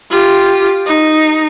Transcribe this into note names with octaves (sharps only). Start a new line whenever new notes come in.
F4 G4
D#4